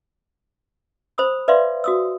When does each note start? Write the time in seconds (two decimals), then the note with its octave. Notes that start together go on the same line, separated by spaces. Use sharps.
1.18 C5 B5 D#6 E6
1.48 B4 D5 E5 F5 C6
1.84 F#4 D#6 E6